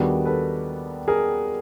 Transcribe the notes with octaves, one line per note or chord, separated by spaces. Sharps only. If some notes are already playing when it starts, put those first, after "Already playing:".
Already playing: D#2 D#3 G3 B3 D4 F#4 G#4
A4 B4
G#4 A#4